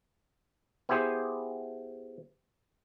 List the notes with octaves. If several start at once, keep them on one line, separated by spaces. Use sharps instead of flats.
B3 E4 G4 G#4 C5